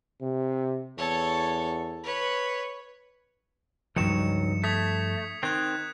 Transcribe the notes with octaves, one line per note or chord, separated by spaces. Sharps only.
C3
E2 A4 C#5
B4 C#5
C#2 G2 D#3 F3 F#3 C#7 E7
A3 D#6 G#6 B6
D#3 C4 F#6 G#6